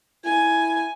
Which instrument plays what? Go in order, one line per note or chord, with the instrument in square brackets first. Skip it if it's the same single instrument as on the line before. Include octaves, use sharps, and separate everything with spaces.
[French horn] E4 [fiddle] G#5